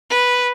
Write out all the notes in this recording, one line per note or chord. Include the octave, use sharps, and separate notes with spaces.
B4